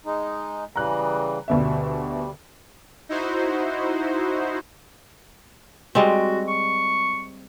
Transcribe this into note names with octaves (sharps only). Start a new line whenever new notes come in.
G#3 D#4
C#3 E3 G3 A#5 F#6
D2 B2 G3 E5
D#4 E4 F#4 C5
G3 G#3 C4 F#4
C#6